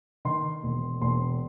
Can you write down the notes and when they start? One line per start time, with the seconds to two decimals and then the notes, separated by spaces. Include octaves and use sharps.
0.25 D#3 C6
0.63 E1
1.01 E1 C6